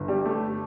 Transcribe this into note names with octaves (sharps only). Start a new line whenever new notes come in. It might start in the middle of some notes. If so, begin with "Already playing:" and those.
Already playing: G1
G3
A3